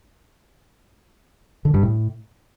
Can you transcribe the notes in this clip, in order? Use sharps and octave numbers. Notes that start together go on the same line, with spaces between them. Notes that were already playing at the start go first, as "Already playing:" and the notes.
D3
G2
A2